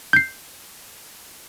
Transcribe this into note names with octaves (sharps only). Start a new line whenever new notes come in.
G6 C7